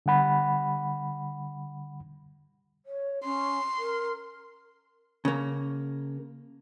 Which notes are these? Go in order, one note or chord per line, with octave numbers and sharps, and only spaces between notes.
D3 G3 F#5 B5
C#5
C#4 C6
A#4
C#3 A#3